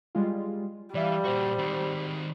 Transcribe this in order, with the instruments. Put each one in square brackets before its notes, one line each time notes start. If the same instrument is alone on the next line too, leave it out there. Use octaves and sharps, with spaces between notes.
[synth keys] G3 G#3 F4
[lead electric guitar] E3 [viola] G3 [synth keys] D5 E5 F5
[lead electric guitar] A#2 F#4 [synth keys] C5
[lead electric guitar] D#3 C4